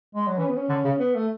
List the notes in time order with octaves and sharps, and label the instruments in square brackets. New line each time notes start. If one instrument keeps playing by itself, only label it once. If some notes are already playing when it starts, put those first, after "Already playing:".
[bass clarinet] G#3
F#3
[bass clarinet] E3 [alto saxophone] C#4
[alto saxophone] B3
C#4
[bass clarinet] D3
C#3
[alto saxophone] B3
A3